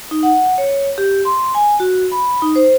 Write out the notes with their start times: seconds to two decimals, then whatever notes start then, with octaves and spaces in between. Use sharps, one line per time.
0.11 D#4
0.23 F#5
0.58 C#5
0.98 G4
1.25 C6
1.55 G#5
1.80 F#4
2.12 B5
2.42 D#4
2.56 C5